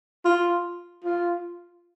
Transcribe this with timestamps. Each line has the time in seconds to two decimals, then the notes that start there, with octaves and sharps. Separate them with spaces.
0.25 F4
1.04 F4